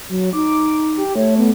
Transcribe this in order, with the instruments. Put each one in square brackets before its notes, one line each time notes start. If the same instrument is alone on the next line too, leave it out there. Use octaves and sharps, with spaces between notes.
[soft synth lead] F#3
[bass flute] D#4 [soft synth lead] D6
[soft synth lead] G4
[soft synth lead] A3 [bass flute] C#5
[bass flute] B3